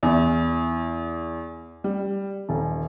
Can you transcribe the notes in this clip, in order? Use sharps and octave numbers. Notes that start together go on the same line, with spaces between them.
E2
G3
D#1